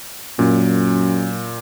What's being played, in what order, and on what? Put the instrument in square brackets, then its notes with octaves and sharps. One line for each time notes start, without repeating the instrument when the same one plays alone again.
[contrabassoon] F#2 [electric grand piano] A#2